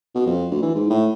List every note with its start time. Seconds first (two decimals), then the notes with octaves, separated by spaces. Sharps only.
0.15 B2
0.27 F2
0.51 D2
0.62 E3
0.75 G#2
0.90 A2